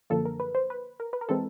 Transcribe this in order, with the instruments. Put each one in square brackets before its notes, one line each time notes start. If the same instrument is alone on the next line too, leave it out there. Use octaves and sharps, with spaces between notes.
[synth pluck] F#2 D3 F3 A#3 A4
A#4
B4
C5
B4
A#4
B4
A#4
E3 G#3 C4 A4